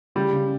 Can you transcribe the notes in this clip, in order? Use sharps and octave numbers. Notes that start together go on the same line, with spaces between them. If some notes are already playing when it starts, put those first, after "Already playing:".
C#3 G3
C#3